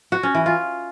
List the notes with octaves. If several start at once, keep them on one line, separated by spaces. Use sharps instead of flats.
F#4
C#4
E3
F4